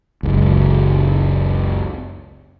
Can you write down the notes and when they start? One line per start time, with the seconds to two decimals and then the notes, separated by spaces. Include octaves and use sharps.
0.23 F#1 C#2